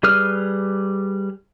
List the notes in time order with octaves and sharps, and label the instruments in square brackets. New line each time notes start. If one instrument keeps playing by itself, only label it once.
[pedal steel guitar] G3 G#4 B4 D#6 F6